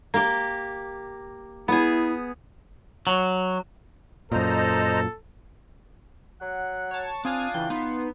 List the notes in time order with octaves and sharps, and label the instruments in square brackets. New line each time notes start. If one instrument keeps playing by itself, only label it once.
[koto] A#3 G4
[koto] B3 G#4 [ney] E4
[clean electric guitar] F#3
[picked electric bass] F#2 A#2 [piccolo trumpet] A4 [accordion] C5 D#5 A#5
[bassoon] F#3 [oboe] F#5
[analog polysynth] C#5 A5
[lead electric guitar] C4 [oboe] D4 [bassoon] F4 [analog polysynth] F5 G#5 D#6
[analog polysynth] C#3 E3 [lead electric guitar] G5
[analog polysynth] B3 [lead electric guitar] D#4 [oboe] C6